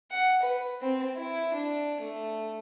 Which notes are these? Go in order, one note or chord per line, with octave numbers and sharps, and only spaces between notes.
F#5
B4
C4
E4
D4
A3